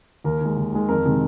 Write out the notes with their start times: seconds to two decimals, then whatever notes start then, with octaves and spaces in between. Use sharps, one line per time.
0.24 D#2 A#4
0.41 D#3 G#3
0.57 D#2
0.73 D#3 G#3
0.89 F2 A#4
1.05 C3 D#3 G#3